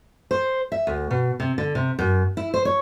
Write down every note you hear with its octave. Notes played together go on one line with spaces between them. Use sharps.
C5
E5
D2
B2
C3
D3
C3
F#2
E4
C5
C#5